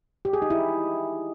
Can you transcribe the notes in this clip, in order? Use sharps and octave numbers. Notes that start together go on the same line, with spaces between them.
G4
G#4
D#4
E4